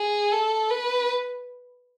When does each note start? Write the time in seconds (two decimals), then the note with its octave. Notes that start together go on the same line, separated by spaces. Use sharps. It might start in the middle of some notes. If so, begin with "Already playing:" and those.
Already playing: G#4
0.33 A4
0.70 B4